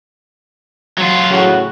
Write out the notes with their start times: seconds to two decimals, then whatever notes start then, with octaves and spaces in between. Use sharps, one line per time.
0.98 F#3 F4
1.30 A2 C#3 F#4